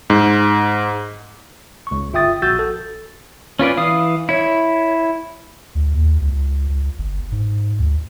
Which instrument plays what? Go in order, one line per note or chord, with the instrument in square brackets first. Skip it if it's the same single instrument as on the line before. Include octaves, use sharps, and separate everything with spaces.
[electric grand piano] G#2
[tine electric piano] C#2 C#6
G1 F4 E5 G5 D#6 A6
A#1 F#4 E6 G6 A6
A4
[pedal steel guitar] C#4 F4 B4 D5
E3 F5 D#6
E4 C#5
[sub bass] D2
D#2
C#2
C#2
G1
G#2
D2